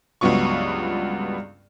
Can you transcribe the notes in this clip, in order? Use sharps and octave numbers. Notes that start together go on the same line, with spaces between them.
C#2 G2 F#3 B3 F4 C#6